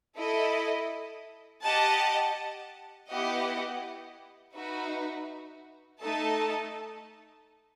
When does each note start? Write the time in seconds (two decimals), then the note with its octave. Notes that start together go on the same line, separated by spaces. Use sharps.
0.16 E4 A4 D#5
1.62 G4 D#5 F#5 A5
3.08 B3 E4 G4 D#5 F#5
4.55 D#4 F#4 B4 E5
6.00 A3 D#4 A4 D#5 A5